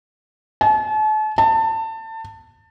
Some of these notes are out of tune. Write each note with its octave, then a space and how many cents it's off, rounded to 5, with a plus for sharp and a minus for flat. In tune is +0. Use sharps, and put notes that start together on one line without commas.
A5 -40
A5 +25